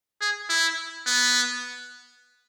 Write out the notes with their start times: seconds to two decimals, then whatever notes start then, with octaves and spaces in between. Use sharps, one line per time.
0.21 G#4
0.49 E4
1.07 B3